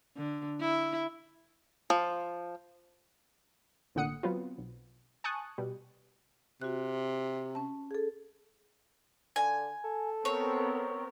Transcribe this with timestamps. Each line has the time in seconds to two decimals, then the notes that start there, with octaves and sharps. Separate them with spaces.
0.17 D3
0.60 E4
1.90 F3
3.95 A1 A#2 D3 F#5 D#6 C#7
4.23 F#3 B3 C4 F4
4.58 B1
5.24 G#5 A5 C#6 D#6 F#6
5.58 B2 G3
6.62 C3 F#4 F#6
7.55 C#4 A5
7.91 G#4 A4
9.36 D3 G#5
9.84 A4
10.25 B3 C4 A#4 C#5